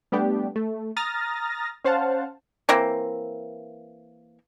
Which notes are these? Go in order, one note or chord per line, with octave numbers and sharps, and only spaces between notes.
G3 A3 B3 D4 G4
A3
A#5 D#6 F6 A6 A#6
C#4 C5 F5 F#5 A5
E3 A#3 C4